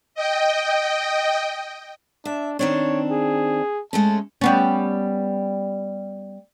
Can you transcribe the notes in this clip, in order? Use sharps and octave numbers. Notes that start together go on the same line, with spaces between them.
D#5 G5
D4 E5
D#3 C4 D4 C#5
G#4
G#3 A3 C#4 A5
G3 B3 C#4